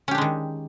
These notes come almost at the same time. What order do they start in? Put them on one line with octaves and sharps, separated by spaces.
C#4 G4 D4 G#3 D#3